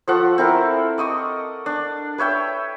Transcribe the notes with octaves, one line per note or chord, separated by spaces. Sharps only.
F3 A4 F#5 C#6
C4 E4 A4 A#4
D5 D#5 C#6 D#6
D4
B4 C#5 E5 G5